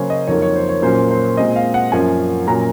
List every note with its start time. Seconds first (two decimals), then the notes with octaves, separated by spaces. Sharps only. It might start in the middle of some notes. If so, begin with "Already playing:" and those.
Already playing: C#3 F#3 A#3 C#4 C5 C#5
0.10 D#5
0.27 F2 D#3 F#3 A#3 C#5
0.42 C#5
0.56 C5
0.69 C#5
0.82 A#2 F#3 A#3 C#4 C5
1.11 C5
1.37 A#2 G#3 C4 D#5
1.56 F5
1.74 F#5
1.92 F#2 F3 A#3 C#4 G#5
2.47 A#2 F#3 A#3 C#4 A#5